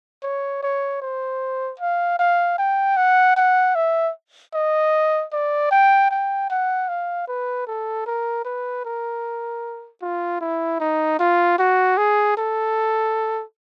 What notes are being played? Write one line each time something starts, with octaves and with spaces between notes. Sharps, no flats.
C#5
C#5
C5
F5
F5
G5
F#5
F#5
E5
D#5
D5
G5
G5
F#5
F5
B4
A4
A#4
B4
A#4
F4
E4
D#4
F4
F#4
G#4
A4